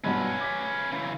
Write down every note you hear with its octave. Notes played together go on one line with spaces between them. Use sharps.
G#1 G2 B2 C#4 B4
D6 B6
C#3 E3